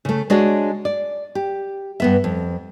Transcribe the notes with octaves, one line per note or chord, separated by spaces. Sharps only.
C#3 A3
G#3 D4 F#4 G#4 C#5 D5
D5
G4
G2 B3 E5
F2